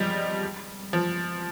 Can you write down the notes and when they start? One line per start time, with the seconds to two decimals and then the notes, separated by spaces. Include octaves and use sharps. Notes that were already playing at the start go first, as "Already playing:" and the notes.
Already playing: F3 G3 G#3
0.93 F3